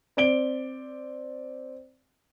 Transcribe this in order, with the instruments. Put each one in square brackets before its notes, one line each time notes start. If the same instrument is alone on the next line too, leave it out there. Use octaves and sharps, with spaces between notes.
[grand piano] C4 D5 D7 G7